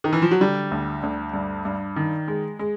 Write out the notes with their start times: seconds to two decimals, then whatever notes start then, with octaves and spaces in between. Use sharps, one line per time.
0.04 D#3
0.13 E3
0.22 F3
0.31 F#3
0.40 D3 G3
0.71 D2
1.03 D2
1.34 G2
1.65 G2
1.96 D#3
2.28 G#3
2.59 G#3